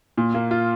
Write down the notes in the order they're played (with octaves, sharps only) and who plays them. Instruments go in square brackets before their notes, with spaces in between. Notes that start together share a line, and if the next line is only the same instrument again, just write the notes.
[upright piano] A#2
A#3
F4